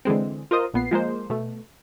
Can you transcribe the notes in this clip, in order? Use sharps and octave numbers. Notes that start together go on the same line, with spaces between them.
D3 E3 G#3 C4
F4 A#4 C5 D#5
A#1 B3 C7
F3 G#3 A#3 C5
B2 A3